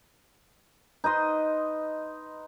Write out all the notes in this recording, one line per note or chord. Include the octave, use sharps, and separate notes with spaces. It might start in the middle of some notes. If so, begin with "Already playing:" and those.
D#4 B4 D#5 C6